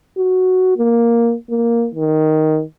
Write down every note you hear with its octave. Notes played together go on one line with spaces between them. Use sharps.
F#4
A#3
A#3
D#3